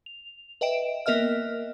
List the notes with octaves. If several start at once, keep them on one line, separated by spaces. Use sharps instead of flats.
F7
B4 D#5 E5 G5 D7 E7
A#3 B3 A#4 D#5 E5 F6